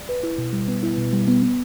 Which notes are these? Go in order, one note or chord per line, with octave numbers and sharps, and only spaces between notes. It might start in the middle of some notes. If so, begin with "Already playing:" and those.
Already playing: D5
B4
E4
B2
G3
B3
E4
B2
G3
B3
B3